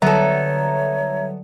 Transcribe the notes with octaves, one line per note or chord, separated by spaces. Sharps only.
D3 F#3 G3 B3 A4 C#5 E5 A#5